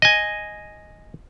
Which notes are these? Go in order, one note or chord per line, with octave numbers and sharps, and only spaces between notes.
D#5 G#5